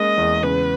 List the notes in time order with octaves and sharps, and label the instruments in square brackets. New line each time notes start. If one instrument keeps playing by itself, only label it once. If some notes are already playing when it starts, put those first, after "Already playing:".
Already playing: [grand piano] G#3 A#3 C#4 [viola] D#5
[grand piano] E2
[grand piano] C#3 [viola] B4